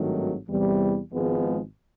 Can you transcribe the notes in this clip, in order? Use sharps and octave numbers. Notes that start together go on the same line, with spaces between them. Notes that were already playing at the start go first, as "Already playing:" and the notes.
Already playing: G#1 G2 D#3 F#3 A3
E2 C3 E3 G3
G#1 G#2 F3 G#3 B3